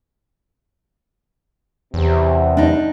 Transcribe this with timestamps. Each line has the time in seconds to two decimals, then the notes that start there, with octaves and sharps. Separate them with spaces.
1.94 E2 C3
2.57 D4 D#4